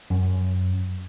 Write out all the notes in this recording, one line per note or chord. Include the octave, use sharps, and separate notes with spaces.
F#2